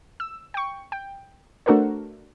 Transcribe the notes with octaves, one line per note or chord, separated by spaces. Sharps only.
E6
G5 C#6
G5
A3 D4 F#4 A4 A#4 C5